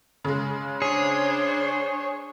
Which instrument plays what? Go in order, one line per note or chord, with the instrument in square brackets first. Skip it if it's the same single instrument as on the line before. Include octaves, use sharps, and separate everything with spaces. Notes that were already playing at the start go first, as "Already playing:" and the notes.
[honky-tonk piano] C#3 G#3
[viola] D4 C5 [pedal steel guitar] G#4 [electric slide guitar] C#5